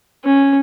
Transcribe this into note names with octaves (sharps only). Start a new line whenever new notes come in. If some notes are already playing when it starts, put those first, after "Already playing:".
C#4